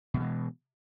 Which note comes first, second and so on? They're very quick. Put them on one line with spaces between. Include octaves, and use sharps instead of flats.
B2 F#3 E3 G#3